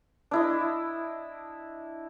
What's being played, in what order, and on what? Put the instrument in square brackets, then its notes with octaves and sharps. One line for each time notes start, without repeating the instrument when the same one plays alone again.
[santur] D4 E4 D#5